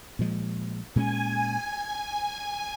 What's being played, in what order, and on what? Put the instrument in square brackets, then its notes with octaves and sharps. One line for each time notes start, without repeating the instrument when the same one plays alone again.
[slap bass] A#2 F3 G#3
[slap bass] A#2 G#3 C#4 [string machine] G#5